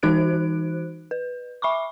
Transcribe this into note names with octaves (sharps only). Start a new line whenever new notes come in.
E3 D#4 F#4 C5 F#6 D7
B4
E5 B5 C#6 D6